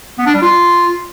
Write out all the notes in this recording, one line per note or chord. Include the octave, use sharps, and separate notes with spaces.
B3
D4
G3
F4